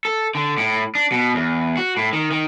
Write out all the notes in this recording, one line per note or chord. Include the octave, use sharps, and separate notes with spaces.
A4
D3
A2
D4
B2
E2
F#4
A2
D#3
D#3